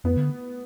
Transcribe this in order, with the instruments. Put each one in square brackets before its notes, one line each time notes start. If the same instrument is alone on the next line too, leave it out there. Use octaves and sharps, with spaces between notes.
[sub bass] F2 [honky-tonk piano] B3
[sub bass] D3